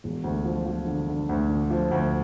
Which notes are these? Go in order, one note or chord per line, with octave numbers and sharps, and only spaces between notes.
E1
D2
F3
F3
D3
D3
D2
D3
F3
D2